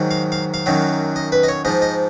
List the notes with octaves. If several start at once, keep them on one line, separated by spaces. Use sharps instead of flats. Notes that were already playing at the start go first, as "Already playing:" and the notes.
Already playing: G#2 D#3 F#3
F5
F5
F5
F#2 D#3 F#3
D#5
B4
D#5
C#5
G#2 F3 D#5
D#5